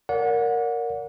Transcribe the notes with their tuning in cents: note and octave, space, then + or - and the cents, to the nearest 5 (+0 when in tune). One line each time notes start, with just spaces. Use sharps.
A#4 -5 D5 -40 F#5 -30